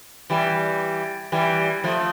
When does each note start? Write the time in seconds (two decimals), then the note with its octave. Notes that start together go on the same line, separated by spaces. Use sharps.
0.30 E3 G3
1.32 E3 G3
1.84 F3 A3